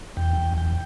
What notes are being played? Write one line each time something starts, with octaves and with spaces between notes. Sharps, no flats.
E2 G5
E2
E2 G5